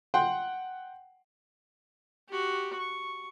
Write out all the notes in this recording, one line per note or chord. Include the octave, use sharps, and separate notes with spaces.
F#5 G5 C6
F#4 G4
C#6